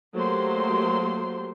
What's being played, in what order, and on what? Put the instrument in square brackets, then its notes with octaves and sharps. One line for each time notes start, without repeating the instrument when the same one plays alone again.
[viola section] F#3 A3 A#3 G4 C5 C6